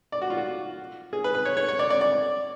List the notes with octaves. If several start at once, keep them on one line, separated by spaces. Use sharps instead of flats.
D5
F#4
F4
F#4
G#4
B4
B4
C#5
C#5
C#5
D5
D5
D5